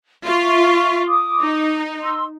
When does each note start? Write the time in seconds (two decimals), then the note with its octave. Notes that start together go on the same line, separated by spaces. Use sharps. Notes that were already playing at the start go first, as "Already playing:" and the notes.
0.26 F4 E5 C#6
1.08 D6 D#6
1.41 D#4
2.01 C6 E6